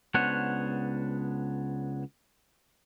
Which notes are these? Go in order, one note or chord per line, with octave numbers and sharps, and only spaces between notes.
C#2 B3 D4 C5 C#5 F#5